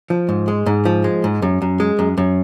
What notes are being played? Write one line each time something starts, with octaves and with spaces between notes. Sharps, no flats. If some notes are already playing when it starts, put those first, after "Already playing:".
F3
G#2
G#3
G#2
F3
G#3
G#2
F#2
F#2
G#3
F#2
F#2